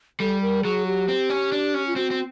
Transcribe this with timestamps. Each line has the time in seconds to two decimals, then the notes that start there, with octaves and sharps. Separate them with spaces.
0.20 G3 A4
0.42 A#4
0.64 F#3 G#4
0.87 G4
1.08 C4
1.30 C#4
1.52 D4
1.74 C#4
1.87 F4
1.96 C4 F#4
2.11 C4